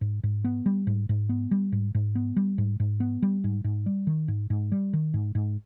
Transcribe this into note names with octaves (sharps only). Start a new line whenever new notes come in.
G#2
G#2
B3
G3
G#2
G#2
B3
G3
G#2
G#2
B3
G3
G#2
G#2
B3
G3
G#2
G#2
G3
D#3
G#2
G#2
G3
D#3
G#2
G#2